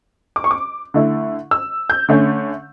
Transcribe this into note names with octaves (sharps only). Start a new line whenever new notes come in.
D6
C#6
D6
D3 A3 E4
E6
G6
D3 A3 C#4